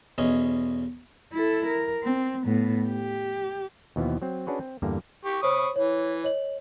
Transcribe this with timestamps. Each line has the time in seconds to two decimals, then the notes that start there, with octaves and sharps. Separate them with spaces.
0.18 B1 E2 C#4 D#5
1.33 E4 A4
1.67 A#4
2.03 C4
2.46 A2 B3
2.89 G4
3.96 D#2 B2 E3 F3 B3
4.22 F#3 C4
4.47 C#4 D4 F#4 G#4 B4 C#5
4.60 C4
4.82 E2 G2 D3 G3 A#3
5.25 G4 C#6
5.43 C5 C#5 B5 C#6 D#6
5.76 E3 C#5
6.24 C#5 D#5 F#7